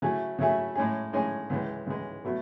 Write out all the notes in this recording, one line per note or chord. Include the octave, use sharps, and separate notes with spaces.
C#3 F#3 A3 E4 G#4
C#3 F#3 A3 E4 G#4
A2 G#3 C#4 G#4
A2 G#3 C#4 G#4
C#2 C#3 E3 G#3
C#2 C#3 E3 G#3
B2 F#3 A3